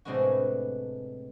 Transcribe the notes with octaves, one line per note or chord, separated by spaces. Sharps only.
A2 C3 G#3 B3 D4 F#4